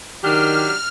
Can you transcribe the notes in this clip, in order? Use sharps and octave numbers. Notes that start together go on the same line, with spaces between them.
D#3 F#3 D4 G4 F6